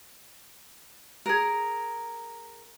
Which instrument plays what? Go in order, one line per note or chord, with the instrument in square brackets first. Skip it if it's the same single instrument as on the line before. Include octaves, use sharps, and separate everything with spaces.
[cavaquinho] G#4 A#4